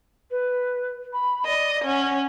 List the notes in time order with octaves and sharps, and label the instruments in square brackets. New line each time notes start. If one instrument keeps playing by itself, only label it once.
[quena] B4
B5
[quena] D5 [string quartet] D#5
[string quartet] C#4 [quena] F#5